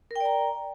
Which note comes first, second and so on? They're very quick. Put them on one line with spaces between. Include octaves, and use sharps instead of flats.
A#4 G5 D5 A#5